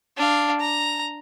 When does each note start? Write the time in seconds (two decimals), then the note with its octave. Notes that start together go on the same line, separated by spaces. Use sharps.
0.17 D4 F5
0.60 A#5